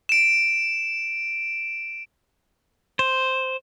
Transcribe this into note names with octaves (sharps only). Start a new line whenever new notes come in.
D7 E7
C5